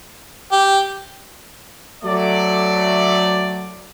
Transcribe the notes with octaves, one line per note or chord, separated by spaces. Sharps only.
G4
F#3 A3 D5